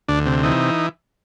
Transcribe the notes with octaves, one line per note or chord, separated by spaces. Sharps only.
D2 D4
C3
E3 D#4